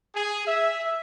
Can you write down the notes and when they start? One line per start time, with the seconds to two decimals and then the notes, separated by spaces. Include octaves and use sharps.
0.15 G#4
0.47 E5